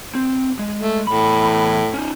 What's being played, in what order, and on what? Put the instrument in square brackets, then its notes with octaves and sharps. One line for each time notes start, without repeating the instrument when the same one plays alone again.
[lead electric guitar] C4
G#3
[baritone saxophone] A3
[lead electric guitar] E2 B5 [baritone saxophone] A2
[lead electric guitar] C#4 D#4